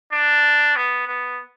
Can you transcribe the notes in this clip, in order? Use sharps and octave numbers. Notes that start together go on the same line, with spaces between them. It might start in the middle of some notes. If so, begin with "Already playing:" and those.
D4
B3
B3